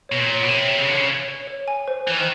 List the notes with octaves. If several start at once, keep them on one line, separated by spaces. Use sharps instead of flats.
B2 C#5
A#2
C#5
B2
C3 C#5
C#5
C#3
D3 C#5
C#3
C#5
C#5
C#5
G#5
C5
E3 C5
D#3